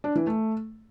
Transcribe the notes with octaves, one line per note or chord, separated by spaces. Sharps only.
D4
E3
A3